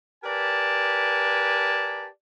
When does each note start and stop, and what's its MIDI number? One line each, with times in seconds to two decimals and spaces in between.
0.24 2.07 67
0.24 2.07 70
0.24 2.07 71
0.24 2.07 74
0.24 2.07 80
0.24 2.07 81